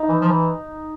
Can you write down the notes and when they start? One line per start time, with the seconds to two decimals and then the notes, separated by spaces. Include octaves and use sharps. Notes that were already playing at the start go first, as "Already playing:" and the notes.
Already playing: D#4
0.09 E3
0.21 F3
0.28 E3